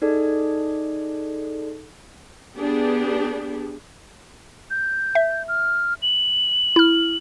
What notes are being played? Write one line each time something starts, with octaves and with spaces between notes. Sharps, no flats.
D#4 G#4 A4 D5
B3 D4 G4 G#4
G6
E5
F6
F#7
E4 F6